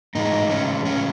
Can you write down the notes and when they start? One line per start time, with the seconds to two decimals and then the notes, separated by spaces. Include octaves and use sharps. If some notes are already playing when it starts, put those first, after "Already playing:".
0.15 A2 E3 G#3 D#4
0.51 C#4
0.85 C#4